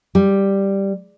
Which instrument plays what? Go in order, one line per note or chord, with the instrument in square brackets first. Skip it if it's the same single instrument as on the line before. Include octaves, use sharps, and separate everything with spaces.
[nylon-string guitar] G3